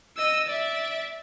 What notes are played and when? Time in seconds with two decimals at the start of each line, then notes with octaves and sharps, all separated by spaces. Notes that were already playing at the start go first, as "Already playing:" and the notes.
0.17 D#5 E6
0.47 D5 E5